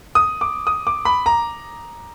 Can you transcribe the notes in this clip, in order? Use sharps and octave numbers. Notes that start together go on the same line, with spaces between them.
D#6
D6
D#6
D6
B5
A#5